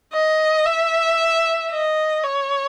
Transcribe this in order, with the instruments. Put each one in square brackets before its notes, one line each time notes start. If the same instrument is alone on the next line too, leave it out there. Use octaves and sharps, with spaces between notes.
[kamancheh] D#5
E5
D#5
C#5